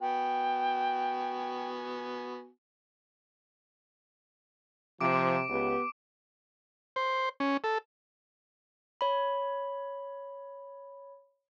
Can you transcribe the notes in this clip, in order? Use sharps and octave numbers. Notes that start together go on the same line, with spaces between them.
B3 F#4 G5 G#5
C3 F3 D6 D7
C#2 B3 G4
C5
C#4
A4
C#5 B5